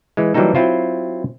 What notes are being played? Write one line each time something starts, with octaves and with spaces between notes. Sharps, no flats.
E3 G#3
E3 F#3 G3 A#3 D#4 A4
F#3 C4 E4 F4 C5